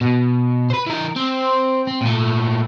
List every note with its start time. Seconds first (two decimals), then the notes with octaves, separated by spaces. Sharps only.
0.01 B2
0.70 B4 C5
0.87 E3 A#4
1.16 C4
1.87 C4
2.01 A#2 A3